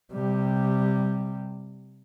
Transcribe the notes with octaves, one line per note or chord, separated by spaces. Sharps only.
C3 G3